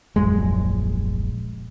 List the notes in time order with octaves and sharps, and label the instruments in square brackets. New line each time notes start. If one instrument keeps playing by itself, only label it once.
[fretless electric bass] D#1 A#1 F#2 G#3